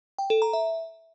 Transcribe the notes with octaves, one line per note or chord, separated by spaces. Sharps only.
G5
A4
A#5
E5